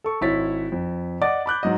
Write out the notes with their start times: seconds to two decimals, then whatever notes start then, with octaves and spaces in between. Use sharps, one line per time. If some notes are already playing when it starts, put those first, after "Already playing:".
0.04 A4 C#6
0.21 G#1 E4 C#5 A6 B6
0.72 F2
1.21 D5 D#5 F#5 D6 A6
1.46 B5 D6 F#6 G6
1.63 G#2 F#3 D#5